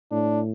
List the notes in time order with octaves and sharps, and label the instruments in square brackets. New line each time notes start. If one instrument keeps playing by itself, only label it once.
[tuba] A2 [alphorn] D4